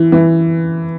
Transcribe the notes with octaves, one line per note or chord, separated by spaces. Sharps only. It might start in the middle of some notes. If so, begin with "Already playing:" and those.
Already playing: E3
E3